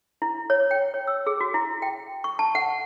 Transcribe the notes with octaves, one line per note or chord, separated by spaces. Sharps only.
E4
C#5
G5
C#5
E6
G#4
F#4
E4
G5
C#6
A5
F#5